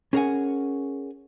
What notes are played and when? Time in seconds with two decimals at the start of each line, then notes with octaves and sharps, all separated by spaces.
0.13 C#4 G#4 A#4 C5 F#5 G#5